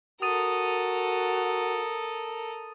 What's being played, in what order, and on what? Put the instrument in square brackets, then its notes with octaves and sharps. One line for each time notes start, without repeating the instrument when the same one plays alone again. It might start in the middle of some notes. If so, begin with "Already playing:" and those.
[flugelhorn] F#4 [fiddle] A4 A#4 [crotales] D#6 A6 D#7